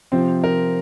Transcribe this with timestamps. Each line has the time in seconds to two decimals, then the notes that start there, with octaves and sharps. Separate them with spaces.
0.12 C3 F3 C4
0.44 A#4